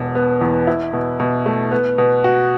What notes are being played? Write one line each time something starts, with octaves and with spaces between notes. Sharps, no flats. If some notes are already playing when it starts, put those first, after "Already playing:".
Already playing: E1 B2
B3
E2
E4
B2
B2
A3
B3
B2
F#4